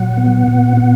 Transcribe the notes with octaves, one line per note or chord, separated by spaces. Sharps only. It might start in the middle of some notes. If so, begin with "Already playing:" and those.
Already playing: A#2 F#3 F#5
B3
A#2
B3